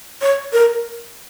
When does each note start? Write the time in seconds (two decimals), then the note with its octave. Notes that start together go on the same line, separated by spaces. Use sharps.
0.21 C#5
0.53 A#4